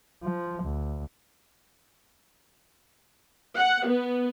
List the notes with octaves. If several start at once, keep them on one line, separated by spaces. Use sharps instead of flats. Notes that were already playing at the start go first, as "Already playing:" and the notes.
F3
D2
F#5
B3